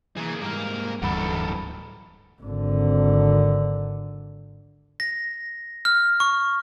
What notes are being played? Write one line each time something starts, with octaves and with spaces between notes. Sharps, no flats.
E3 A#3 G#4
G#2 G3 A#3 F5
D1 E2 G2 A4 A#4 F#5 B5
G#1 D3
A#6
F6
C#6